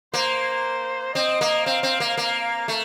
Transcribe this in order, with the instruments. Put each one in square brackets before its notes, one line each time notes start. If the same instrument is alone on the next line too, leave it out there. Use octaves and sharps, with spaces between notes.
[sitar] A#3 [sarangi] C5
[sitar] C4 [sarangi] D#5
[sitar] A#3
[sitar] C4 [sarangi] F5
[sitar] C4
A#3
A#3
A3